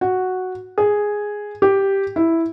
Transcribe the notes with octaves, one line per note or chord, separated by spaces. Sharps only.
F#4
G#4
G4
E4